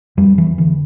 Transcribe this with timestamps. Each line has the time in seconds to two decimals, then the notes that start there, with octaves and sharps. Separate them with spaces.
0.17 F2 G3
0.38 E3
0.58 D3 E3